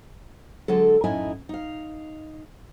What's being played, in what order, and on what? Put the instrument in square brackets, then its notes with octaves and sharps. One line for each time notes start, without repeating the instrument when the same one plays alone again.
[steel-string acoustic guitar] D3 F#3 G#3 A4
F#2 A2 D#4 E4 D#5 G#5
D#4 F5